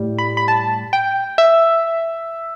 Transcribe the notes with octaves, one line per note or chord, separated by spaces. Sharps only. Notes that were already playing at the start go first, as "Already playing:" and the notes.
Already playing: A2 G3
B5
B5
A5
G5
E5